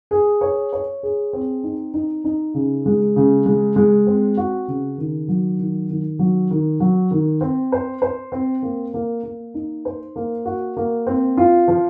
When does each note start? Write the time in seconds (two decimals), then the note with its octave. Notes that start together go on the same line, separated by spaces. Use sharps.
0.11 G#4
0.41 C#5
0.73 C#5
1.03 G#4
1.33 C4
1.64 D#4
1.94 D#4
2.24 D#4
2.54 C#3
2.86 G#3
3.16 C#3
3.46 G#3
3.76 G#3
4.07 C4
4.37 F#4
4.68 C#3
4.98 D#3
5.28 F#3
5.59 D#3
5.90 D#3
6.19 F#3
6.51 D#3
6.80 F#3
7.11 D#3
7.41 C4
7.72 C5
8.02 C5
8.32 C4
8.62 A#3
8.94 A#3
9.23 A#3
9.54 D#4
9.85 C5
10.16 A#3
10.45 F#4
10.77 A#3
11.07 C4
11.37 F4
11.68 F3